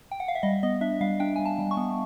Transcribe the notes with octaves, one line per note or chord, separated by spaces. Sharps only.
G5
F#5
F5
E5
G3 D#5
B3 D#5
D4 E5
G3 F5
D4 G5
G3 G#5
A5
G3
C#6
B3